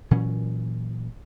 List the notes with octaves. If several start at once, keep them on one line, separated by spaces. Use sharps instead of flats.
A#2 E3 F#3 C#4